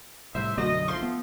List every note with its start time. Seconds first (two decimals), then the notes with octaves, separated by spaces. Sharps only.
0.35 C2 A2 C5 E5
0.57 B1 F#2 D3 A3 F#4 D#5
0.88 F3 A3 C6
1.03 B3